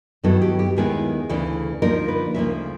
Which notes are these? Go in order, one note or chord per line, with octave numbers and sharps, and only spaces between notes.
G2 D#3 F#3 B3 E4 A4
G4
G4
D#2 D#3 G#3 B3 E4 G#4
D2 C#3 E3 A3
D3 F3 A#3 D#4 A#4
B4
D2 C#3 F3 A#3 E5